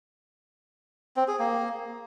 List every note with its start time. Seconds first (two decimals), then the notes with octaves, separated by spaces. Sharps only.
1.17 C4
1.28 G#4
1.39 A#3